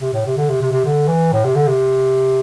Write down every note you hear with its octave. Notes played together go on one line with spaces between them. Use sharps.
C3
A2
C3
D3
C3
C3
C3
D3
E3
A2
C3
D3
C3